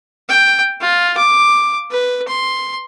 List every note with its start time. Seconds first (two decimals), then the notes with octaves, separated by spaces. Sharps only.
0.29 G5
0.81 F4
1.17 D6
1.91 B4
2.28 C6